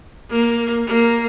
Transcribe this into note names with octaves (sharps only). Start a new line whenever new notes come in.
A#3
A#3